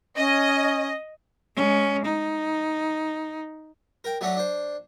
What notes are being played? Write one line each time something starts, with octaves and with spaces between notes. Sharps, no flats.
C#4 D#5
G#3 C#4
D#4
A#4 G5
F#3 A3 C#4 D4 F#4
D4 C5